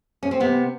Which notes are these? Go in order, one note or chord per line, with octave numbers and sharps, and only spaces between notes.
C#4
C4
C3 B3